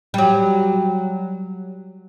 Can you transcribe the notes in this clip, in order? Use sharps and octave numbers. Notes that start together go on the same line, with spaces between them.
F#3 G3